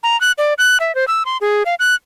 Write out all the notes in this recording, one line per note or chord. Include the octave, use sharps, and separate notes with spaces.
A#5
F#6
D5
F#6
E5
C5
E6
C6
G#4
F5
F#6